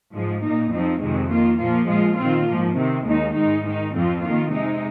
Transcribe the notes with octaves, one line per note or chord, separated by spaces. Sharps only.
G#2 F3 G#3
A#2 A#3 D#4
F2 F3 C4 D#4
F2 C3 D#3 G#3
D#3 A#3 F4
A#2 F3 A#3 F4
A#2 G#3 F4
D#3 C4 F4
G#2 F3 A#3
C3 D#3 C4
D#2 D#3 G#3 D#4
G#2 G#3 D#4
D#3 G#3 D#4
F2 F3 C4 F4
D#3 A#3 F4
C3 G#3 D#4